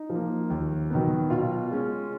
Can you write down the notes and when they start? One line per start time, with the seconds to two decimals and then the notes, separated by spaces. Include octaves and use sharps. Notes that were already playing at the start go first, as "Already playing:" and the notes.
Already playing: D#4
0.10 F3
0.15 A#3
0.50 D#2
0.90 D#3 F#3 B3
1.30 B2 F4
1.71 G#3 C#4